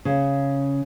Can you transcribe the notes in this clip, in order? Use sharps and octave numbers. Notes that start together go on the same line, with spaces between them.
C#3